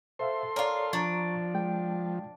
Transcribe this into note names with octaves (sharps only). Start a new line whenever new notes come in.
A4 C5 E5 F5 C6
F4 A#4 C#5 D5
F3 D4 A#5 C#6
G#3 G5